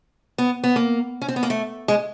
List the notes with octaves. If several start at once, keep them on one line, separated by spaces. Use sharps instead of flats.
B3
B3
A#3
C#4
C4
B3
A#3
A3
G#3